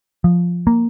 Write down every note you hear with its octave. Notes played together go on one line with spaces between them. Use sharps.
F3
A#3